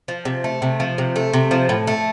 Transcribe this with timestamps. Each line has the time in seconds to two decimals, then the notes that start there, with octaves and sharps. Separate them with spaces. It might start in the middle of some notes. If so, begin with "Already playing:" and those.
0.08 F3
0.25 C3
0.44 A3
0.62 C3
0.80 F3
0.98 C3
1.16 A3
1.33 C3
1.51 F3
1.69 A2
1.87 A3